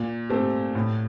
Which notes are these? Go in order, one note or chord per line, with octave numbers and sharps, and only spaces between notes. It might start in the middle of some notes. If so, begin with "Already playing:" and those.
Already playing: A#2
A3 C4 G4
A2